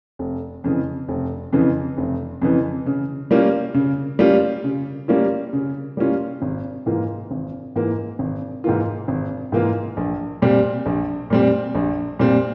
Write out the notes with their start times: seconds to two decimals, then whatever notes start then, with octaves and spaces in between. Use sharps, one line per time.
0.19 F1
0.64 F2 C#3 E3
1.08 F1
1.53 F2 C#3 E3
1.98 F1
2.42 F2 C#3 E3
2.86 C#3
3.31 G3 A#3 C#4 F4
3.74 C#3
4.19 G3 A#3 C#4 F4
4.64 C#3
5.08 G3 A#3 C#4 F4
5.53 C#3
5.97 G3 A#3 C#4 F4
6.42 G#1
6.86 G#2 E3 A#3 F4
7.31 G#1
7.76 G#2 E3 A#3 F4
8.19 G#1
8.64 G#2 E3 A#3 F4
9.08 G#1
9.52 G#2 E3 A#3 F4
9.97 A#1
10.42 A#2 G3 C4
10.86 A#1
11.30 A#2 G3 C4
11.75 A#1
12.19 A#2 G3 C4